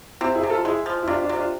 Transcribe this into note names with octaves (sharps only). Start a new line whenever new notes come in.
C3 C4 E4
E4 G#4
C3
F4 A4
G#3 E4 G#4
F3
E4
C3 D4 F4
D4 F4
C3
D4 F4